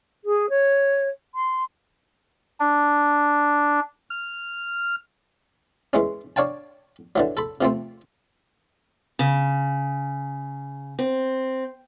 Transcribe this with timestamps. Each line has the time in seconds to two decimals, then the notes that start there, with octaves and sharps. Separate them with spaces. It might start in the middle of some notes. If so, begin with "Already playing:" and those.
0.25 G#4
0.50 C#5
1.35 C6
2.60 D4
4.10 F6
5.93 E3 G#3 C#4
6.36 D4 C#5 F5 G5 A5
7.16 D3 E3 F#3
7.37 A4 B5
7.61 C3 F3 A3 C4
9.19 C#3
10.99 C4